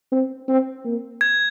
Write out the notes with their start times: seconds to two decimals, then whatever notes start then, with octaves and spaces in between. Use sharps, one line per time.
0.12 C4
0.48 C4
0.84 A#3
1.21 G#6